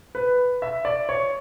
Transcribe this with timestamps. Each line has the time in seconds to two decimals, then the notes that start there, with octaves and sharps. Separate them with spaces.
0.15 B4
0.62 E5
0.85 D5
1.09 C#5